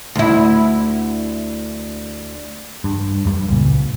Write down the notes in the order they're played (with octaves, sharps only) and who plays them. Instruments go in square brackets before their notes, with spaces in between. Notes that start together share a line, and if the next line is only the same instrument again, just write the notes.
[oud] D2 E4
[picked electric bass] G2
F#2 G3
C#2 A#2